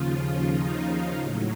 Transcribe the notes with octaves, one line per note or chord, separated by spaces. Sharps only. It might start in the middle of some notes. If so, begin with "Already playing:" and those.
Already playing: D#2 C#3 F3 F4
D#4
A2 F#3